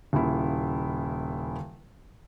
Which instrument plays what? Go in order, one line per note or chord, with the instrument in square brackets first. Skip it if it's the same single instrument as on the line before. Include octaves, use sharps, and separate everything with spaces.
[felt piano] D#1 C#3 A#3 E4